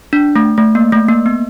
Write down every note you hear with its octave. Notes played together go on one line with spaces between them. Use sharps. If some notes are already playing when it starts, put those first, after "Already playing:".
D4
A3
A3
A#3
A3
A#3
B3